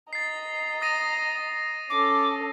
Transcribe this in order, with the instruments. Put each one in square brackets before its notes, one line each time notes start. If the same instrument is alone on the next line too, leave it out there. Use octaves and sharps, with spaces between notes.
[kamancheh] D#5 A#5 [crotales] A6 C7
[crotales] D#6 A#6 D#7
[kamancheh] C#4 A4 [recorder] D6